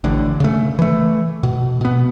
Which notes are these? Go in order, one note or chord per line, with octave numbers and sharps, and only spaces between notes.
A1 A2 D3
C#3 A3
E3 A3
B2
B2 B3